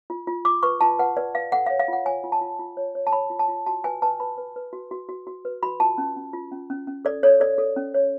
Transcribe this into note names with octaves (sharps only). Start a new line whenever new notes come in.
F4
F4
F4 D6
B4 C#6
F4 A5
B4 F#5
B4 D5
B4 F5
A4 F#5
C#5 F5
F5
F4 F#5
C#5 G#5
F4
A5
F4
F4
C#5
C#5
A5
C#5 B5
F4
A5
F4
F#4 A5
B4 G#5
B4 A5
B4 B5
B4
B4
F#4
F#4
F#4
F#4
B4
F#4 B5
F4 A5
C#4
C#4
F4
C#4
C#4
C#4
A4 D5
A4 C#5
A4 D5
A4
C#4
C#5